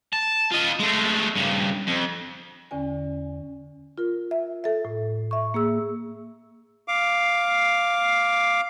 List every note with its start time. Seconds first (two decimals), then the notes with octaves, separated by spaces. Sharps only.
0.13 A5
0.52 F4 D#5
0.79 G#3 A3
1.35 G2 C#3
1.87 F2
2.71 E2 D3 C#4 D5 G#5
3.98 F4 A#4
4.31 E5
4.64 A4 E5
4.85 A2
5.31 E5 C#6
5.54 A#3 G#4 E6
6.88 F5 D6